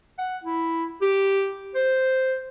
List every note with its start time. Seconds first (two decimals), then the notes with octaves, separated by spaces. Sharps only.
0.18 F#5
0.44 E4
1.02 G4
1.75 C5